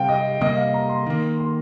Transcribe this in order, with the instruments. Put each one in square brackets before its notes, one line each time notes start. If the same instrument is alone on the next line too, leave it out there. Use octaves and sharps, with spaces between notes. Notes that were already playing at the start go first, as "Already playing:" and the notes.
Already playing: [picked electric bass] C3 G3 C4 [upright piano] F5 G5
[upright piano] D#5
[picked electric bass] C3 G3 A#3 [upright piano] D#5
[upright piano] F5
A#5
C6
[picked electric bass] D#3 A#3
[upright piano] C6